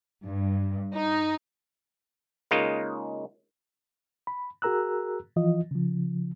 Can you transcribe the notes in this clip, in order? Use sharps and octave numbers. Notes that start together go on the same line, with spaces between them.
G2
D#4
C#3 G#3 A#3 D#4 F4
B5
F#4 G#4 A#4 A#5 E6 F#6
E3 F3 F4 D#5
C#3 F3